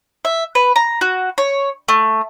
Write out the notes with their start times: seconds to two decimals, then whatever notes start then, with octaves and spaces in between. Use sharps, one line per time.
0.25 E5
0.55 B4
0.76 A#5
1.01 F#4
1.38 C#5
1.88 A3